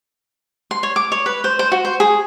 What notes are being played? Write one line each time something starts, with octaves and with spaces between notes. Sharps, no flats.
C6
C#5
D6
C#5
B4
C5
C5
F#4
C5
G#4